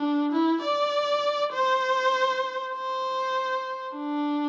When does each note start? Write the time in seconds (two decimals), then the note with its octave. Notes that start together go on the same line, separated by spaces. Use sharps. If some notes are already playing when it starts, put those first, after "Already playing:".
Already playing: D4
0.32 E4
0.62 D5
1.54 C5
2.75 C5
3.96 D4